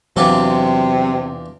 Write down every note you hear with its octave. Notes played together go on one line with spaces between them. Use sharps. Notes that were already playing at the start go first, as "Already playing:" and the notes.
E2 C3 F#3 D4 F4